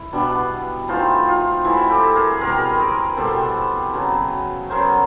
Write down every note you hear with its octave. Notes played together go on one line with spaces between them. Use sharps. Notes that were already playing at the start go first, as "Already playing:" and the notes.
Already playing: E4
B2 G3 B3 D4
E3 A3 C4 D#4 F4
D#4 F4
E3 A3 C4 E4 F#4
G4 A4
G#4 A#4
B2 G3 C4 A#4
B4
G#4 A#4
G#4 A#4
B2 G3 C4 A4 B4
C#3 F#3 B3
C#3 F#3 B3 A#4 C5